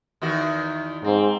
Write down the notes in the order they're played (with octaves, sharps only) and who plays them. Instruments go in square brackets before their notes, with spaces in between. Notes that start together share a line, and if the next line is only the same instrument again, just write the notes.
[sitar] E2 D#3 F#4
[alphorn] G#2 [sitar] C4